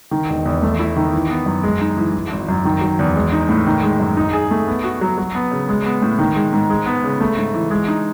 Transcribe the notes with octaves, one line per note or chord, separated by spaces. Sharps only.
D#3
E1
E2
A3
E4
D#3
E3
B3
F#2
G#3
D#4
E3
E3
G#1
F#2
D#3
F#3
E2
G#3
D#4
A2
D#3
G#3
F#2
D#4
G#4
A3
B3
F#4
F#3
F#3
B3
C#3
G#3
B3
A2
D#3
G#3
G#2
G#3
B3
C#3
A3
G#2
E3
G#3
D#4